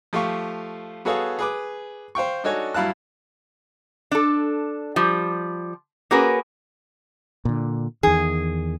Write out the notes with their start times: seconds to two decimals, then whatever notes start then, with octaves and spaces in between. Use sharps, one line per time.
0.13 F3 A3 G4 F5 C#6
1.05 B3 F#4 G#4 A4 C#5 F5
1.39 G#4 B4 D6
2.15 C5 F5 G5 C#6
2.44 D4 D#4 F#4 A4 C#5 G#5
2.74 G2 F#3 E4 F5 A5 F#6
4.11 D4 A4
4.96 F3 G3
6.11 A#3 C#4 F#4 G#4 A#4 B4
7.45 A#2 D3
8.03 E2 D#3 G#4